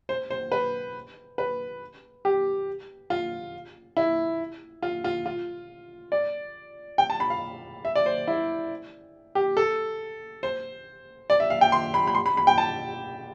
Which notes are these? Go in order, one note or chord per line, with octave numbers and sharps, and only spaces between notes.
C5
C5
B4
B4
G4
F4
E4
F4
F4
F4
D5
G5
A5
B5
F5
E5
D5
C5
E4
G4
A4
C5
D5
E5
F5
G5
C6
B5
B5
C6
B5
B5
G5
A5